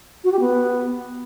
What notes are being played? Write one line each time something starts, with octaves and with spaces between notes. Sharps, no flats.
F#4
G4
B3